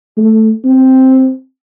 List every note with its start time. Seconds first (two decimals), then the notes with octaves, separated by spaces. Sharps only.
0.18 A3
0.65 C4